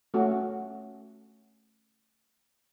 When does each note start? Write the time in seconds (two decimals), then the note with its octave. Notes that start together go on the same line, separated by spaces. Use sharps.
0.14 A3 C#4 F#4